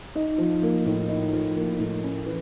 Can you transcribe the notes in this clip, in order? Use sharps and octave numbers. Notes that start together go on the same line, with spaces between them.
D#4
F3
A#3
A2
D#4
F3
A#3
A2
C#4
E3